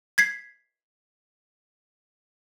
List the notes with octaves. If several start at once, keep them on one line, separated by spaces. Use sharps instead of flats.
G#6 B6 C7